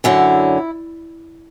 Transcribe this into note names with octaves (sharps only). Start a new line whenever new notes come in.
F#2 D3 F#3 E4